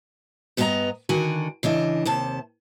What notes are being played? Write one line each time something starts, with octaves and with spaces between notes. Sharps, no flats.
G2 B3 G4 B4 D#5 A#5
D3 D#3 F#4 G#5
C#3 E3 D4 D#5
D#2 C3 A5